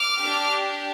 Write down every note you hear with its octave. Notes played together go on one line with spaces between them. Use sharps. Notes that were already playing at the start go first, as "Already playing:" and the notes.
Already playing: D6 F6
D4 G4